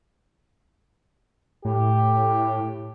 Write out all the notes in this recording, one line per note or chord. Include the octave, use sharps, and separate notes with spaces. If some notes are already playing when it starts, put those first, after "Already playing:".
A2 G4